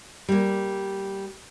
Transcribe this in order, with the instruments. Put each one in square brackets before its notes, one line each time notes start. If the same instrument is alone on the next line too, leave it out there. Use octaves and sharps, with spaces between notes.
[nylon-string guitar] G3 A#3